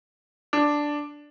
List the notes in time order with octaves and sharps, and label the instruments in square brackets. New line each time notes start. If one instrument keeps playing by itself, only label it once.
[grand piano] D4